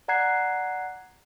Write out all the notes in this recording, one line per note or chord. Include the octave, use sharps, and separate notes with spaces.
D5 F#5 A#5 F#6 G#6 C7